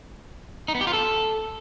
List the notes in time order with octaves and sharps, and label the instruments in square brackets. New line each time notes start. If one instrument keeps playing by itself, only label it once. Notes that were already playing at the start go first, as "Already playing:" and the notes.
[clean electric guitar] D#4
B3
G4
F4
A4